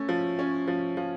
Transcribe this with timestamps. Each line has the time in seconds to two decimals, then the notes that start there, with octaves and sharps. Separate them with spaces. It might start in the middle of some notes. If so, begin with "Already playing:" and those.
Already playing: A3 C#4
0.09 F3
0.39 C#4
0.68 F3
0.97 F3